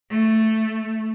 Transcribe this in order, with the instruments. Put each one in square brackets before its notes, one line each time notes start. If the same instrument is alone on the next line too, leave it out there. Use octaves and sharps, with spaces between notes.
[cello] A3